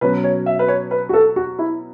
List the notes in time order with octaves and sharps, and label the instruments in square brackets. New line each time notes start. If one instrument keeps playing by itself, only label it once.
[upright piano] B2 F#3 C#4 F#4 [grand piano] B4
[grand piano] C#5
E5
B4
C#5
B4
F#4
A4
F#4
E4